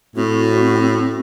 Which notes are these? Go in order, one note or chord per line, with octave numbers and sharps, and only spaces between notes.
A2 C4 F#4